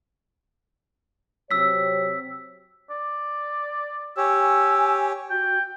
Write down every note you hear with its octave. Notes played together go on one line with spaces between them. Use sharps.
C3 F#3 C#5 E6 B6
D5
G4 C#5 G#5 E6
F#4 G5